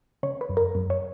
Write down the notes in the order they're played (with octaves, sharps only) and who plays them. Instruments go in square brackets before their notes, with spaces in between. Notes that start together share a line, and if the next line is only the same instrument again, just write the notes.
[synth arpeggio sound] C#3 C#5
B4
F#2
A#4
F#2
C#5